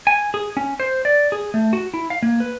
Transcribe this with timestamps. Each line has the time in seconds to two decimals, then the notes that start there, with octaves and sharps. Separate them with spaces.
0.07 G#5
0.34 G#4
0.57 C#4
0.80 C5
1.05 D5
1.32 G#4
1.54 A3
1.73 F#4
1.94 E4
2.10 F5
2.23 A#3
2.40 B4